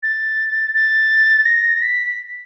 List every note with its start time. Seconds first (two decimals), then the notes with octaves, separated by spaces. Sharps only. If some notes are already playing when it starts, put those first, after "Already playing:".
0.03 A6
0.74 A6
1.46 A#6
1.82 B6